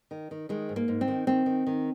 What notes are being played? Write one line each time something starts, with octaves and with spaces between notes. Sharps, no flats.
D#3
D#3
D#3 G#3
G#2
A#3
G#2
C4
D#3
D#3 C4
D#3
D#3